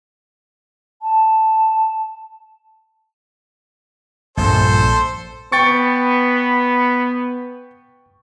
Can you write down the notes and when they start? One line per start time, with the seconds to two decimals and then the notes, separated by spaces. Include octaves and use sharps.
1.02 A5
4.37 A#1 G2 A4 C5
5.52 B3 G5 C#6 A6 C#7